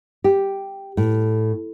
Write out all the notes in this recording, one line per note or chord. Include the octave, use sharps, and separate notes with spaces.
G4
A2